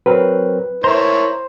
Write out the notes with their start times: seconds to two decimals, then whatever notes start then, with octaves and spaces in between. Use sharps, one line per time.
0.06 F#3 C4 A#4 B4
0.84 E4 A#4 C5 C#5 A#5